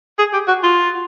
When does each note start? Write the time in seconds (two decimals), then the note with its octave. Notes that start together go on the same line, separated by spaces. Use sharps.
0.19 G#4
0.33 G4
0.48 F#4
0.63 F4